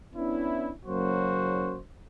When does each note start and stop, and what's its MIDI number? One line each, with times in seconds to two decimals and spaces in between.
0.16 0.72 59
0.16 0.72 61
0.16 0.72 62
0.16 0.72 64
0.86 1.79 30
0.86 1.79 54
0.86 1.79 58
0.86 1.79 61
0.86 1.79 66
0.86 1.79 72